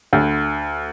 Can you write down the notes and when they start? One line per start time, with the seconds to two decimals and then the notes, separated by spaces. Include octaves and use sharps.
0.13 D2